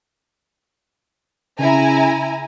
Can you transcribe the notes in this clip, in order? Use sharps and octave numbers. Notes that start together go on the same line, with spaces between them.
C#3 E4 G#5 A#5